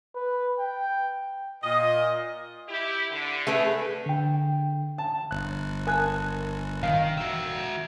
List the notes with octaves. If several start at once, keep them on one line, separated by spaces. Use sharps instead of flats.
B4
G5
A#2 D#5
E4 G4
D3
A3 G#4 B4
D3 G5
A5
G1 F#6
A#4 G#5 A5 F#6
D#3 F5
F#4 E5